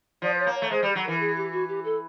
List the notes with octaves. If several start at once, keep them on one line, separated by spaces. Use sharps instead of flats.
F3 D5
C5
C#5
A#3
C#5
A3
G#3 C5
G3
F#3
E3 A#4
G#4
G4
F#4
G4
A4